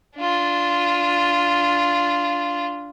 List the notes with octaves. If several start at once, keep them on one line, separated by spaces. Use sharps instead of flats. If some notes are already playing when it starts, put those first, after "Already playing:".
D4 F4